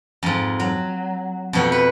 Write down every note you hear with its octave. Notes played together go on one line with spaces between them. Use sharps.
F2 G#2
F#3
F2 B2 F#5
B4